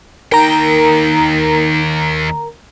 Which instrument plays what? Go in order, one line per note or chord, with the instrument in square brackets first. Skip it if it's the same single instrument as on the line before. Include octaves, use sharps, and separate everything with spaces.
[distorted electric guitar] D#2 G5 [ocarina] D#4 [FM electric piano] A#4 A#5